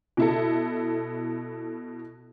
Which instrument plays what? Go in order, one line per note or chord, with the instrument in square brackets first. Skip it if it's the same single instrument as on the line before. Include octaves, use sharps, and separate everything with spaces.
[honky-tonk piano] B2 E4 A4